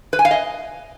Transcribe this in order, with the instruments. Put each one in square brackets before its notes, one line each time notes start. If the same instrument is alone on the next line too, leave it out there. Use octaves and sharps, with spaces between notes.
[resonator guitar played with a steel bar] B4
G#5
F5
D#5